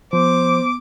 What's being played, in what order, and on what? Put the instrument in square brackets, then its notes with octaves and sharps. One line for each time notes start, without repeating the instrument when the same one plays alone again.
[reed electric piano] F3 [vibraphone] B3 [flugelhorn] C5 [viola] D6